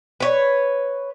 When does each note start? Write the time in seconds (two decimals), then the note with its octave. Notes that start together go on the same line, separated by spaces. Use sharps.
0.20 B4 C#5